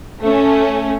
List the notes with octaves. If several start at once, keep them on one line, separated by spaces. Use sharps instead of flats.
A3 C#4